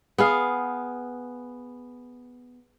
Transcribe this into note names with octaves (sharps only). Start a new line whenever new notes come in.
B3 G#4 F5